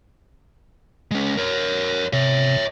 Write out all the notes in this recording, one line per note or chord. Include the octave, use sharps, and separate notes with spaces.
G#3 C#4
A#4 C#5
C3 C#5 E5